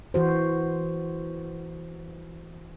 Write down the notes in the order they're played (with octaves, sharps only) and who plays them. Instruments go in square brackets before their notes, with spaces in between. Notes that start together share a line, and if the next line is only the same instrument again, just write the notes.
[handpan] E3 F#4 C5